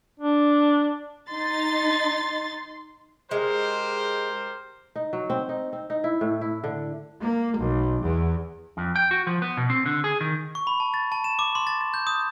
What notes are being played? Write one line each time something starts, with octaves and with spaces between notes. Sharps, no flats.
D4
D#4 C6 A6
G#3 G4 A#4 C5
D#4
F#3
C4
D#4
C4
D#4
E4
A2
E4
D3
A#3
B1
E2
F2
G5
F#4
F3
B3
B2
C4
D3
G#4
D#3
C#6
B5
A5
A6
A5
E7
D6
C6
A6
A6
G6
D#6